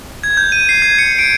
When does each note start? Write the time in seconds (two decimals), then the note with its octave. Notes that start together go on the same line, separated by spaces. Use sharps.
0.24 G#6
0.37 G6
0.52 D#7
0.69 C7
0.82 G#6
0.99 C#7
1.19 D7